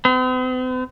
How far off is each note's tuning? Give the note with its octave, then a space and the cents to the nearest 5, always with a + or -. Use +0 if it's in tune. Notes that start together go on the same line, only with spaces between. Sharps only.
C4 -45